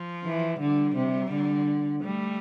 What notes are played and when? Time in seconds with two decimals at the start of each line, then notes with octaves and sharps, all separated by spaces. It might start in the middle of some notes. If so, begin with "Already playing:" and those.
Already playing: F3
0.25 E3
0.60 D3 G3
0.95 C3
1.31 D3
2.03 G3 A3